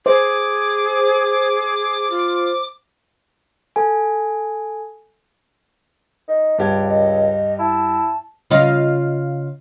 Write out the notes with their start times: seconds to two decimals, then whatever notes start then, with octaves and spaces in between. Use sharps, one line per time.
0.06 G#4 C5 D6
2.10 F4
3.76 A4 G#5
6.28 D#4
6.58 C#2 G2 G4 G#6
6.88 D#5
7.59 E4 A5
8.50 C#3 F4 D#5